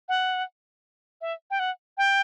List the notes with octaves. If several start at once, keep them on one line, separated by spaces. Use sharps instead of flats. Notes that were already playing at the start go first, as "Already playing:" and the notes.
F#5
E5
G5
F#5
G5